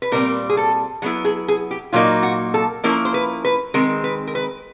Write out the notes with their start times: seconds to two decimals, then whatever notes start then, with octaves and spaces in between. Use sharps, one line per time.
0.02 B4
0.12 A#2 G3 C4 A#4
0.49 G#4
0.57 A4
1.02 F#3 B3 E4 G#4
1.25 G#4
1.48 G#4
1.71 G4
1.93 A#2 F#3 A#3 D#4 F4
2.23 F#4
2.54 A4
2.84 F3 A#3 C#4 E4 A#4
3.05 C5
3.14 B4
3.45 B4
3.74 D#3 G#3 C4 A#4
4.04 B4
4.27 A#4
4.35 B4